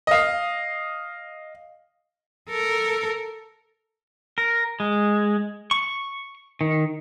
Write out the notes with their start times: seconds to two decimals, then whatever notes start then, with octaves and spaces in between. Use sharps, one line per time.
0.07 D#5 F5
2.50 A4 A#4
4.38 A#4
4.80 G#3
5.71 C#6
6.61 D#3